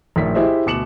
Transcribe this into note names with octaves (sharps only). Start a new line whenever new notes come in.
A#1 A2 D#3 B6
E4 G4 G#4 C5 D#5 E5
D2 B2 D6 C#7 E7 F#7